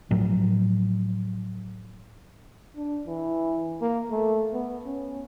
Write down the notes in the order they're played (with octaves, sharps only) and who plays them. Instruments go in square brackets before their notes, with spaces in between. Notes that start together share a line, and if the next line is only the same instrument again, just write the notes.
[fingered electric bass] A2 F3 F#3
[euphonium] D4
E3
A#3
A3
B3
C#4